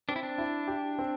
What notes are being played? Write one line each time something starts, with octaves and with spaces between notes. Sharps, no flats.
C4 D4
E4
D4
E4
G4
C4